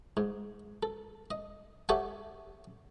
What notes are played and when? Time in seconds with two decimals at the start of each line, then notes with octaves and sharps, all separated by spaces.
0.17 G#2
0.83 A4
1.31 D#5
1.89 G4 A4 C#5 E5 F#5 G#5